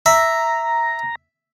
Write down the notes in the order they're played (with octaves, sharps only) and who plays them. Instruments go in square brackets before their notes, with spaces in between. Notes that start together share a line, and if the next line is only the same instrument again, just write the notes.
[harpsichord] E5 [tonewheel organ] A#5